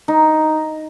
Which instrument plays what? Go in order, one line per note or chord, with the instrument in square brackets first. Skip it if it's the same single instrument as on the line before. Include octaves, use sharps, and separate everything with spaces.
[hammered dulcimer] D#4